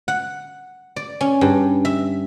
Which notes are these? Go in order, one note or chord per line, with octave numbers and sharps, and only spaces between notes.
F#5
D5
C#4
G2
E5